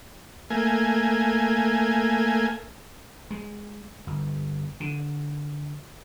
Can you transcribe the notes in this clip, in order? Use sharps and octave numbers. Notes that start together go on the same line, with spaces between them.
A3 A#3 G#5
G#3
G1
D3